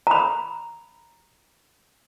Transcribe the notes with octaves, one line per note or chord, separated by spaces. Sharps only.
A#5 B5